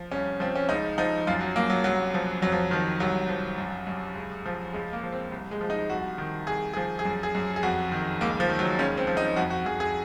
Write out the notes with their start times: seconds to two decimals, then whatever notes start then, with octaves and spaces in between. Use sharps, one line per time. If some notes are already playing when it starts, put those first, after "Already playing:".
Already playing: F3
0.11 C2 C#4
0.40 F3 C4
0.55 C#4
0.69 C#2 D#4
0.98 F3 D#4
1.27 F#2 F4
1.41 F#3
1.56 F#2 A#3
1.70 F#3
1.84 C2 F#3
2.14 F3
2.42 F2 F#3
2.52 F3
2.71 D#3 F3
3.00 C2 F#3
3.29 F3
3.58 F#2
3.87 F#2
4.15 C#2
4.46 F3
4.73 C#2 G#3
4.93 A#3
5.03 F3
5.12 C4
5.32 C2
5.51 G#3
5.61 F3
5.70 D#4
5.90 C2 F#4
6.18 D#3
6.47 C2 G#4
6.73 F3 G#4
6.99 G#4
7.05 F#2
7.23 G#4
7.35 F#2
7.56 G#4
7.63 F2 F#4
7.92 D#3
8.21 C#2 A#3
8.40 F3
8.49 D#3
8.59 F#3
8.79 C#2 C#4
8.97 C4
9.07 F3
9.17 D#4
9.36 F2 F#4
9.50 F#4
9.66 F2 G#4
9.80 G#4